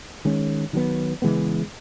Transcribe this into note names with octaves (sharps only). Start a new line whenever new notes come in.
D#3 G#3 C#4
D#3 F#3 B3
C#3 E3 G#3 B3